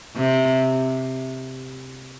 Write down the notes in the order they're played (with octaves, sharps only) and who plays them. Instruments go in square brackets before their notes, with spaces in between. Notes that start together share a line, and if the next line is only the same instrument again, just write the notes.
[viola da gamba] C3